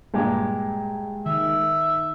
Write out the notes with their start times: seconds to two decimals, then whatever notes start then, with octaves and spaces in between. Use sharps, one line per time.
0.14 G2 A#2 G#3 G4
1.26 D#3 E5